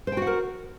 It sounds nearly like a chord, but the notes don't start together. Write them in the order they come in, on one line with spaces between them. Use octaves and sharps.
C5 G5 F#4 F#5 A#4